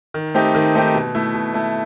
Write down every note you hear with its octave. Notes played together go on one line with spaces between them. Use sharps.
D#3
A3 C4 D#4 G4
D#3
A3 C4 D#4 G4
B2
A3 E4
B2
A3 E4